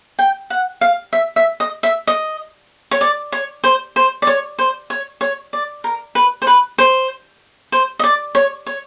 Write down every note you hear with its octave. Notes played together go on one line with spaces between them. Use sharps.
G5
F#5
F5
E5
E5
D#5
E5
D#5
C#5
D5
C#5
C5
C5
D5
C#5
C5
C#5
C#5
D5
A#4
B4
C5
B4
C5
C5
D#5
D5
C#5
C#5